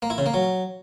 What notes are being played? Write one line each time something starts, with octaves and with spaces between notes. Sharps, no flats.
A#3
E4
C#3
A#3
F#3